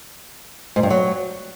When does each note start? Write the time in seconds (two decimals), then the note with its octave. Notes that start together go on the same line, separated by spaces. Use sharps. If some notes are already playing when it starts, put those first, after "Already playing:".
0.76 G#2
0.83 G2
0.90 F#3